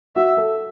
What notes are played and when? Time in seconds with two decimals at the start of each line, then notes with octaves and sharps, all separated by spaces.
0.16 F#4 E5
0.37 A4